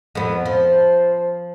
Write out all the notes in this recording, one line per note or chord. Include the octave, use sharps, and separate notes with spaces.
F2 B3
F3 C5